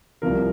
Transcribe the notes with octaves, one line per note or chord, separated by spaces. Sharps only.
C2 C3 F3 A#4